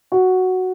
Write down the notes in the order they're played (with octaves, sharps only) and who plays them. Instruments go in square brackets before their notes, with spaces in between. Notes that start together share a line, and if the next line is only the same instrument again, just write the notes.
[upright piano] F#4